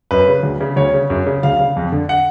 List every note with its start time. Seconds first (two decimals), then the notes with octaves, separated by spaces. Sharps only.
0.11 F#2 B4
0.28 C#3
0.43 D2
0.61 C#3
0.76 D2 C#5
0.94 C#3
1.10 F#2
1.26 C#3
1.43 D2 F5
1.59 C#3
1.76 F2
1.92 D3
2.09 F#5